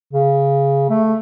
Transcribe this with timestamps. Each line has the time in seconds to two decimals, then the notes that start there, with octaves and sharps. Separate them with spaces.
0.13 C#3
0.90 A3